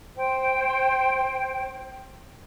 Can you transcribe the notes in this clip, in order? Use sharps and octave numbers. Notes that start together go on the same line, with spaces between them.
C5 G5